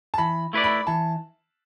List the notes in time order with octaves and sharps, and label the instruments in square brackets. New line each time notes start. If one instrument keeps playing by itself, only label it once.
[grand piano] A5
[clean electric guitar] E3 [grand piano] B5
[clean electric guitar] A3 E4 B4 D5
[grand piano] B5
[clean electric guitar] E3 [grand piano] A5